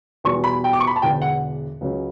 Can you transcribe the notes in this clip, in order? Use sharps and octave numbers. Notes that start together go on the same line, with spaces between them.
E2 B2 G3 C#6
B5
G5
D6
C#6
B5
A5
E1 E2 D3 G5
F#5
C#2 C#3 F#3 C#4